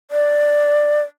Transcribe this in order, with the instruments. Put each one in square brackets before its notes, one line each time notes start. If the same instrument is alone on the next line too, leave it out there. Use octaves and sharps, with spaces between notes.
[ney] D5